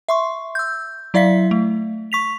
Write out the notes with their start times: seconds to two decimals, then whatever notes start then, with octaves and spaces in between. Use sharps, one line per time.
0.09 E5 C6 C#6
0.55 E6 G6
1.14 F#3 E4 D5 E5 F5 B6
1.51 A3
2.12 C#6 B6 F7